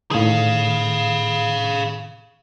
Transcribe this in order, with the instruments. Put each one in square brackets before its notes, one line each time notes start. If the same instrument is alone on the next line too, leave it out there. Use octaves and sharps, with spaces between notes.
[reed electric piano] A2 D#3 [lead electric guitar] G#4 F5